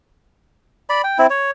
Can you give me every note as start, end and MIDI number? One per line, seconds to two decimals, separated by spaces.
0.90 1.02 74
0.90 1.02 83
1.04 1.18 79
1.18 1.27 60
1.18 1.27 64
1.30 1.51 73